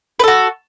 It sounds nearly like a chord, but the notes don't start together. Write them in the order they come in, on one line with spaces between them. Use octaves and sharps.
B4 A4 F#4